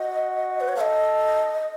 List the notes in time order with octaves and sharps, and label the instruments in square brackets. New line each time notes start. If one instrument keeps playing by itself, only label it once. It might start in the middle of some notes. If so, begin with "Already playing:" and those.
Already playing: [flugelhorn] F#4 [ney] D#5
[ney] B4
C#5
[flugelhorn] A4 [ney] D#5 F5